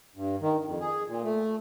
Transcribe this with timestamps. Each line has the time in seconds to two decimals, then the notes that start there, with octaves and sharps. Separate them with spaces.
0.16 G2
0.41 D#3
0.65 F2
0.80 G#4
1.08 A#2
1.24 A3